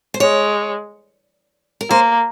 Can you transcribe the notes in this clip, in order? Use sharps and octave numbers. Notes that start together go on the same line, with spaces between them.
C5
G#3 C#5
A#4
A#3 C5